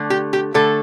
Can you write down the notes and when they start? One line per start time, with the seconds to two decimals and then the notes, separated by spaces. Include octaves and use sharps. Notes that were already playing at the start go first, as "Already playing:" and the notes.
Already playing: D3 A3
0.10 G4
0.33 G4
0.54 D3 A3 A4